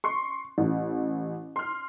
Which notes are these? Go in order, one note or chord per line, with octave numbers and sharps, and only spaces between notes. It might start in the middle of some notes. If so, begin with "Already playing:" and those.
C6 C#6
A1
C6 F6